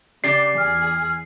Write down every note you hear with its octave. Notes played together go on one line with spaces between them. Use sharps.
C#3 D4 G4 D5 C7
E2 G#4 F6